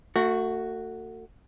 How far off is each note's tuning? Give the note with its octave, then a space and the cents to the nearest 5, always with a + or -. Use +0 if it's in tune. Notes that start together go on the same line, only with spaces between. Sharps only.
A3 +35 F#4 +0